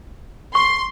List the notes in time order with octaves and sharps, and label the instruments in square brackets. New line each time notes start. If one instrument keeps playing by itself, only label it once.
[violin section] C6 [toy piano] C#6